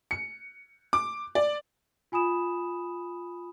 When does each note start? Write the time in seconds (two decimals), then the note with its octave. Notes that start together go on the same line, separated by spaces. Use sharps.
0.11 C#7
0.93 D6
1.35 D5
2.12 F4 G#5 B5 D#6 E7